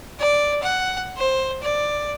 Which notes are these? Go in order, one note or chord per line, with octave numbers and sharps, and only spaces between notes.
D5
F#5
C5
D5